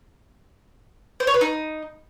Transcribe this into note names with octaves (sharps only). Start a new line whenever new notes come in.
C5
C#5
B4
D#4